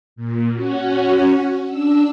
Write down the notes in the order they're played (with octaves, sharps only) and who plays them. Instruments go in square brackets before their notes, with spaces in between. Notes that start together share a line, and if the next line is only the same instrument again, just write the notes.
[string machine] A#2
C#4 F#4
D4 E6